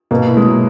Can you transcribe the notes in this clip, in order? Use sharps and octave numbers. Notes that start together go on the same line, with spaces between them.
B2 A#3
E4
G#3
F#3